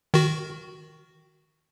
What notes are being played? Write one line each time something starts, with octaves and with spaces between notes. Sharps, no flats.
D#3 F#4